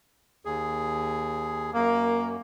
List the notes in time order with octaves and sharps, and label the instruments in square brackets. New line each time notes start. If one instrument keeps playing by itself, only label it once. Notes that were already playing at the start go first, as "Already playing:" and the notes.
[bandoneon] D#2 G#4
[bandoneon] F#2 [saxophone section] A#3